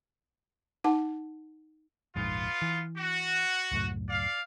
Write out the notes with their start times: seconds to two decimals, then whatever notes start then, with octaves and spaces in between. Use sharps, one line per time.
0.84 D#4 F#5 A5
2.16 F1 A#1 G#2 B3 F4
2.62 E3
2.97 F#4
3.72 C#2 F#2 A2
4.09 D5 F5